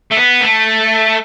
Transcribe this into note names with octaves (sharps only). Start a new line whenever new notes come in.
A3
B3
A3